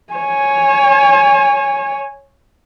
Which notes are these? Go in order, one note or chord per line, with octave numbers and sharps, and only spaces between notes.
C#5 G#5